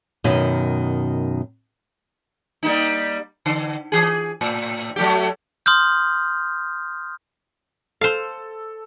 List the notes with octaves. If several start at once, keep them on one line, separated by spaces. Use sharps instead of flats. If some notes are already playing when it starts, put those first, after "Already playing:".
F#2 B2 D#3
G3 A#3 D#4
D3
E3 G#4
A2
F#3 A3 G4
C6 D#6 F6 G6
A4 C5 F5